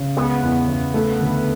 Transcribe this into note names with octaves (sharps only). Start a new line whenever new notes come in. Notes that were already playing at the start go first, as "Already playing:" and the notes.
Already playing: C#3
G#3 B3
E2
C#3
A3
D2